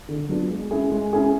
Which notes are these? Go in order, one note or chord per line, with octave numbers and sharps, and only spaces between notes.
D3
F#3 B3 D4 F4
G#3
C#4 E4 G#4
G#3
C#4 E4 G#4